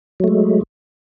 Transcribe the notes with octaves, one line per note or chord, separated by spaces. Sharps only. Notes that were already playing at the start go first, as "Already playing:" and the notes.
F#3 G#3 A3